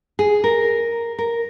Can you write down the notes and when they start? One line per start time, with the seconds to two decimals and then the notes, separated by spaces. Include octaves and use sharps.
0.19 G#4
0.44 A#4
1.19 A#4